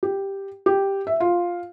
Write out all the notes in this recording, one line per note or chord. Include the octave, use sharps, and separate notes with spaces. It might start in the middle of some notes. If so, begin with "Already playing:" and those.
G4
G4
E5
F4